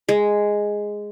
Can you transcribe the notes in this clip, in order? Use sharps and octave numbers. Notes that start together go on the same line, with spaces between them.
G#3